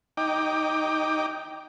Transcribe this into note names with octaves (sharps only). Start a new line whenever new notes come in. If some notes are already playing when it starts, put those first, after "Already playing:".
D#4 G5 D6